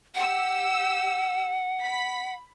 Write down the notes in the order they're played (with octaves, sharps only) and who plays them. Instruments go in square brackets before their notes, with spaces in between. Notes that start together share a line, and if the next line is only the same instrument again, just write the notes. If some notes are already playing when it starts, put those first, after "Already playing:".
[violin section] G4 E6 [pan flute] F#5
[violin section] B5 B6